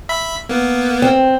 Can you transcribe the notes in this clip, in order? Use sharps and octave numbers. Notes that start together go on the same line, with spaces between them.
E5 B5 B6
A#3 B3
C4